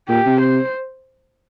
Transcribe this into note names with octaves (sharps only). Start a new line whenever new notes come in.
A#2 G4
C3
C5